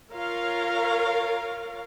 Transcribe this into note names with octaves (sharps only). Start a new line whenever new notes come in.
F4 A#4 C#5 F5